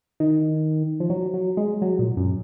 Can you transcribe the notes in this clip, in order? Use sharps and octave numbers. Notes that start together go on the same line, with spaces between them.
D#3
F3
F#3
F#3
G#3
F#3
A#2
F#2